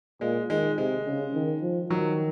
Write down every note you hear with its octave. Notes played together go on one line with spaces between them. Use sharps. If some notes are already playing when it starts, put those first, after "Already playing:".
A#2 G#3
D#3 G#3
C3 G#3
C#3
D#3
F3
D#3 F#3